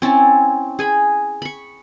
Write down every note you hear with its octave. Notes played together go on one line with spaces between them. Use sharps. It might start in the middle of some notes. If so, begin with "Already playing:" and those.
C4 C#4 E4 A5
G#4 G#5 B5
B5 C#6